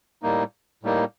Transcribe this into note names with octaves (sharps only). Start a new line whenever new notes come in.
A2 G3 A#3 D#4
A2 G3 A#3 D#4